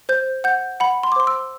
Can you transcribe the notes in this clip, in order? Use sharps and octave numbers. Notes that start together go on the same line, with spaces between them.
C5 G6
F#5 G6
F#5 B5
C6
D6
C5 C6
E6